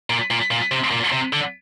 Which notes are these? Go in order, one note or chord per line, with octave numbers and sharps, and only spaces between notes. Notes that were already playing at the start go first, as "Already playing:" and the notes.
A#2
A#2
A#2
C3
A#2
C3
D3